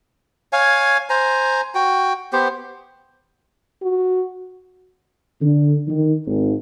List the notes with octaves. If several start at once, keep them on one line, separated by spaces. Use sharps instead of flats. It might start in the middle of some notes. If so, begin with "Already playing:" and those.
C#5 F5 G#5
C5 G#5 A#5
F#4 G5
B3 G4 C5
F#4
D3
D#3
G#1